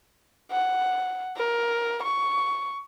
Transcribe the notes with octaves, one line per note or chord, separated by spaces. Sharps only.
F#5
A#4
C#6